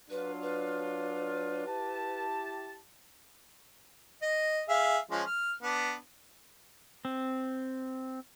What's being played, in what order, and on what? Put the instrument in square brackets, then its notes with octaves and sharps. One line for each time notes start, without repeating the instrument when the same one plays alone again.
[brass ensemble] F#3 D4 F4 [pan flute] B4
[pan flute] B4
[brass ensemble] E4 G4 A5
[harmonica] D#5
G#4 E5 F5
F3 G#3 C#4
F6
B3 D4
[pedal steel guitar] C4